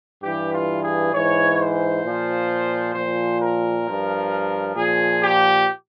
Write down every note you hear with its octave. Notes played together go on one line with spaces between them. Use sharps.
G2 E3 G4
F4
G#4
G#2 E3 C#5
C5
A#2 F3
A#2 F3 C5
A#4
G2 F3
A#2 F3 G#4
G4